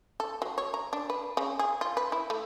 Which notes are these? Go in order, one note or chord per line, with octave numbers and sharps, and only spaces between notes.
A4
F#3
C#5
A#5
D4
B4
C#3
G#4
F4
B4
E4
A3